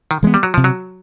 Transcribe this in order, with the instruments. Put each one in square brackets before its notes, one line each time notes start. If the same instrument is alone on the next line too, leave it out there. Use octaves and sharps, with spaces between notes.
[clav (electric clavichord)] D#3
[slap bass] E3 G#3 B3
[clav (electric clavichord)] G3
F#3
[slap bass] C3 [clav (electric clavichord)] F3
[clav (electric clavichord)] F#3